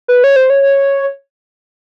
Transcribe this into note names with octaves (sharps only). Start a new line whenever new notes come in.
B4
C#5
C5
C#5